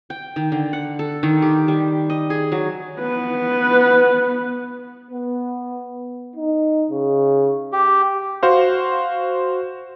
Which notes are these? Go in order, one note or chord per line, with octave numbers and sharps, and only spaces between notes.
G5
D#3
D3
F#5
A4
D#3
G4
G3
D#5
G#4
F#3
B3 B4
B3
D#4
C#3
G4
F#4 C5 F5